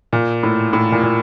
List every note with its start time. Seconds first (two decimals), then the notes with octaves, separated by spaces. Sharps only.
0.13 A#2
0.43 A2
0.73 A2
0.92 A#2
1.03 A#2